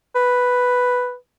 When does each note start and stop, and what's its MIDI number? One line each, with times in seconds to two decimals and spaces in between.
0.15 1.15 71